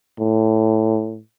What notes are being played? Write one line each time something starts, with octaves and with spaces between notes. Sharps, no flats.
A2